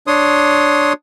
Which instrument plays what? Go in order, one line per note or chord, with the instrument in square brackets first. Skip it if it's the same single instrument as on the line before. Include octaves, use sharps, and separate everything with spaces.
[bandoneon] D4 C#5 C6 D#6